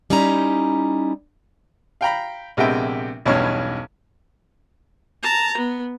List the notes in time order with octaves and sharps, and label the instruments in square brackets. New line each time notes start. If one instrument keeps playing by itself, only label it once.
[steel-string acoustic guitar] G3 C#4 D#4 E4 A#5
[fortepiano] F5 G5 A#5 B5
A#1 C3 G#3 B3 E5 G5
B1 E2 G2 B2 C#4 C#5
[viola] A5 A#5
B3